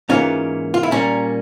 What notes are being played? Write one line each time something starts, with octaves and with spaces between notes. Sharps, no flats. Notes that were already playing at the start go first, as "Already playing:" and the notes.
G#2 E3 A#3 C#4 F4
F4
E4
A#2 G3 A#3 C#4